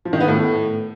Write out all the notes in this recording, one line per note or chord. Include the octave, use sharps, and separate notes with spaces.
F3
D#3
B3
A2